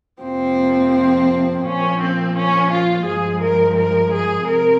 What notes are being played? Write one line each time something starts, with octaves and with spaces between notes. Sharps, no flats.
F2 C3 F3 A#3 C4
A#2 F3 A#3 C#4
C4
C#4
F4
G2 F3 G#3 G#4
A#4
A#4
G#4
C3 A#4